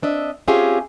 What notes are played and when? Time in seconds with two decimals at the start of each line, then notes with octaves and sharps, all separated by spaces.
0.02 C4 D4 D#5 E5
0.48 C4 C#4 F4 G4 G#4 E5